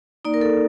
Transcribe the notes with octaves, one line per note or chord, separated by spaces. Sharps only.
A#3 D#4 D5
A#4
A4